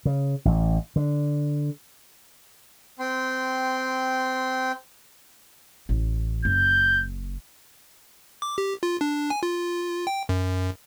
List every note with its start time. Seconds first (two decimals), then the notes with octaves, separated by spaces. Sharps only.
0.05 C#3
0.45 A1
0.96 D3
2.99 C4 G5 C6
5.89 A1
6.45 F#1 G6
8.42 D6
8.58 G4
8.83 F4
9.01 D4
9.30 G#5
9.43 F4
10.07 G5
10.29 F#2